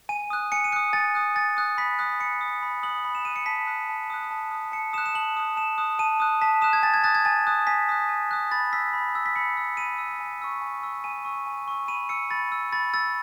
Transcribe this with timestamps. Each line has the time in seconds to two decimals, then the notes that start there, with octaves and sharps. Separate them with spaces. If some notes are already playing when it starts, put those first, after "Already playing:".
0.09 G#5 D#7
0.30 D#6 F#6
0.52 G#5 C#7
0.64 D#7
0.72 D#6 F#6 C#7
0.93 G#5 A6
1.15 D#6 F#6
1.35 G#5 A6
1.57 D#6 F#6
1.78 B5 B6
1.99 D#6 F#6
2.20 B5 C#7
2.41 D#6 F#6
2.62 B5
2.83 D#6 F#6 F#7
3.05 B5
3.15 E7
3.25 D#6 F#6 D#7
3.36 C#7
3.46 A5 B6
3.67 D#6 F#6
3.89 A5
4.10 D#6 F#6
4.31 A5
4.51 D#6 F#6
4.72 A5 C#7
4.93 D#6 E7
4.98 F#6
5.06 E7
5.15 A5 F#7
5.36 D#6 F#6
5.56 A5 E7
5.78 D#6 F#6
5.99 A5 D#7
6.20 D#6 F#6
6.41 A5 B6
6.61 D#6 F#6 E7
6.73 G#6
6.83 G#5 A6
6.94 G#6
7.04 D#6 F#6 A6
7.15 G#6
7.25 G#5 A6
7.47 D#6 F#6
7.67 G#5 B6
7.89 D#6 F#6
8.09 G#5
8.31 D#6 F#6
8.51 B5 A6
8.73 E6 B6
8.93 B5
9.15 E6
9.26 B6
9.36 B5 C#7
9.57 E6
9.77 B5 D#7
9.98 E6
10.20 G#5
10.42 C#6 E6
10.61 G#5
10.83 C#6 E6
11.04 G#5 D#7
11.25 C#6 E6
11.47 G#5
11.68 C#6 E6
11.88 B5 D#7
12.09 E6 C#7
12.31 B5 A6
12.52 E6
12.73 B5 A6
12.94 E6 A6